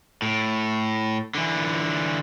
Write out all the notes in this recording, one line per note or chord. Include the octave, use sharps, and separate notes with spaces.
A2
D3 E3